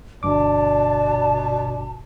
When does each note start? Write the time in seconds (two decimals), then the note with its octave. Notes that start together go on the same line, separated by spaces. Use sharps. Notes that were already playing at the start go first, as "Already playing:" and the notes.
0.23 G1 G2 B2 D5 A5 D6